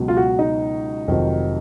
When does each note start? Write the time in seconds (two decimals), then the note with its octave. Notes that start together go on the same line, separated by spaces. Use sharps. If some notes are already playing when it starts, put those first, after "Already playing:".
Already playing: C#2 B2 F#3
0.08 F4
0.17 F#4
0.39 D#4
1.07 F1 F2 D#3 F#3